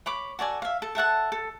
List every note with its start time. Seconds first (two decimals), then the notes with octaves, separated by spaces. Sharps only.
0.06 C#5 B5 D6
0.39 F#4 A4 D5 G#5
0.62 E5 F5
0.82 A4
0.95 A4 E5 F#5 A5
1.32 A4